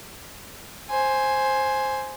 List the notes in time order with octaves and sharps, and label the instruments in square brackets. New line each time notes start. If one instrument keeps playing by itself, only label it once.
[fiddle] C5 G#5